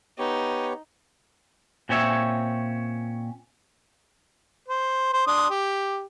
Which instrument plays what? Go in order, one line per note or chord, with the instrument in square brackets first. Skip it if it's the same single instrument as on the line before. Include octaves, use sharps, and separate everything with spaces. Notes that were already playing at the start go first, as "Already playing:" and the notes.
[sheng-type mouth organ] B3 G4 C#5 [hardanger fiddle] D#4
[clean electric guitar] A#2 C4 C#4 C#5 E5
[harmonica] C5
C5
D4 C6 D#6
G4